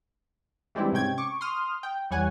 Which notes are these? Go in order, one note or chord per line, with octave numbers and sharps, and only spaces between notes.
E3 G3 G#3 C4 D4 E4
G#2 C3 C#4 G5 G#6
C#6 D6
C6 D#6 F6
G5
E2 G3 C#5 F#5 G#5